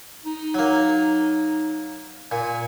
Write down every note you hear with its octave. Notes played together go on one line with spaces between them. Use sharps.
D#4
F#3 A#3
A#2 G#5